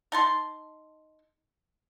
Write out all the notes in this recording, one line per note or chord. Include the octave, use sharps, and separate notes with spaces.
D#4 A5 C6